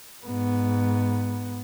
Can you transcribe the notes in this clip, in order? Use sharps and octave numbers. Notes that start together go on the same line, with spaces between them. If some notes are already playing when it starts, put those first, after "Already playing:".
G#2 B3